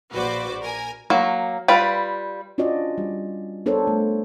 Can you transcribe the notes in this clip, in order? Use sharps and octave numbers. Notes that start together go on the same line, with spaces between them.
A#1 F#4 B4 C5 D5 D6
A#4 G#5
F#3 A#3
G3 F4 B4 D5
C#4 D4 F4 F#4 D5 D#5
G3
B3 D4 A4 A#4 C5 C#5
A3